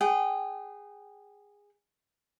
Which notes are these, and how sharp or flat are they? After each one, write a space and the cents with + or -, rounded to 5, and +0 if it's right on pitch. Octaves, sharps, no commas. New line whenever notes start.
G#4 -15 G5 -35